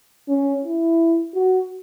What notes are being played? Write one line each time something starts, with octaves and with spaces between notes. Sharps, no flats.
C#4
E4
F#4